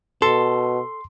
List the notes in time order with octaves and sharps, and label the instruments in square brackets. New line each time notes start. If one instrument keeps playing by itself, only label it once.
[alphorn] B2 [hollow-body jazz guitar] A4 [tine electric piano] C6